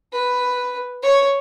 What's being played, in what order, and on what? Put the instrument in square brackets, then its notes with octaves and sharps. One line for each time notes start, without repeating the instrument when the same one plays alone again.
[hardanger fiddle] B4
C#5